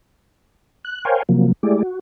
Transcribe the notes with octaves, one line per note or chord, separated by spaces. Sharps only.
F#6
A#4 C5 C#5 F5 G5 G#5
C3 F3 F#3 A#3
G#3 A3 E4 G4 G#4 D5
F#4